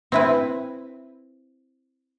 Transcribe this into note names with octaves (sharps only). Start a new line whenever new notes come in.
C4 E4 B4